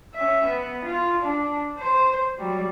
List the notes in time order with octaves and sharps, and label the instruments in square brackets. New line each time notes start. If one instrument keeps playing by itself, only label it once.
[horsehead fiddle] C#4 E5
B3
F4
D4
C5
F#3 G3